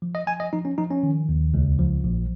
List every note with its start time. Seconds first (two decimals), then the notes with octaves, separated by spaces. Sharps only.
0.02 F3
0.15 D#5
0.27 F3 G#5
0.40 D#5
0.53 F3 D#4
0.65 C#4
0.78 F3 D#4
0.91 C#4
1.03 D#3
1.29 D#2
1.54 C#2
1.79 F3
2.04 A#1